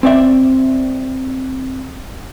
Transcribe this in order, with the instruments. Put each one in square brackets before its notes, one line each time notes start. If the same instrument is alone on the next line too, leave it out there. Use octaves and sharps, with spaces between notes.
[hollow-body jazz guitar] C4 D5 E5